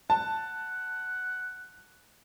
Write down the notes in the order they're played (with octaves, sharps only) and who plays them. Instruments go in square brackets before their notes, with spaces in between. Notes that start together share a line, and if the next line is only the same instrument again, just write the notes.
[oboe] F#5 [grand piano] A5